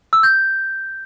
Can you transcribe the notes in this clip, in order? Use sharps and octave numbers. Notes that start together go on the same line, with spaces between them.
E6
G6